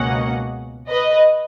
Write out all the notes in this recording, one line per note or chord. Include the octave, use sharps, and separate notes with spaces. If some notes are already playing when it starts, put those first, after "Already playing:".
Already playing: C#2 B2 A#3 C#4 D#5 F#5
B4 D#5